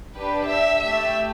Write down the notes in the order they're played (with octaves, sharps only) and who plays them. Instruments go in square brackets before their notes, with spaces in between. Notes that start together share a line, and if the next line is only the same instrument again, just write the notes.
[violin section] D4 G4 B4
E5
A3 G4 E5